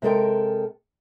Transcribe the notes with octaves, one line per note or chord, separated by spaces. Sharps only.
C3 G#3 A4 A#4 G5